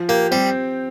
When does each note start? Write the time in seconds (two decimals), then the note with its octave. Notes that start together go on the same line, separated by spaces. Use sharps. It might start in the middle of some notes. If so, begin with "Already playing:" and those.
Already playing: F3
0.09 A#3 G4
0.31 G3 C4